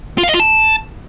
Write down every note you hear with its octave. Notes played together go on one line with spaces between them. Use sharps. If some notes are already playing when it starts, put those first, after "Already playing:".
F4
F5
D#5
F4
A5